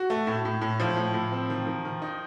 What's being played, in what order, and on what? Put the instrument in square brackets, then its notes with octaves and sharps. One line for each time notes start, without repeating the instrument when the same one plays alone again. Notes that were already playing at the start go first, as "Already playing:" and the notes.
Already playing: [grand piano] F#4
A3
A2
A2
A2
[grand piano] A2 [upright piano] F3
[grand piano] A2
A2
C4
D#3
D#3
D#3
D#4